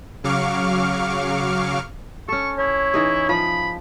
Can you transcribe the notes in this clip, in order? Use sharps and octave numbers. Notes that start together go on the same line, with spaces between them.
C#3 F#3 F5 C#6 D6 F6
C#4 A4 C#6
E4 C#5
E3 D#4 G#4
F3 B5